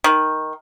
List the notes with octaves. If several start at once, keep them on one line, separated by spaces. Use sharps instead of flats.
D#3